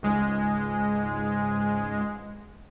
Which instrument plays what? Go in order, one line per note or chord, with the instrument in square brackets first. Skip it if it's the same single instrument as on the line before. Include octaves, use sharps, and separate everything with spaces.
[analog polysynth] C#2 G#2 G#3